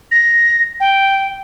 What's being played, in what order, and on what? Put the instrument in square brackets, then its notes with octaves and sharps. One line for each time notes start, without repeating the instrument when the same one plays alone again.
[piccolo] A#6
G5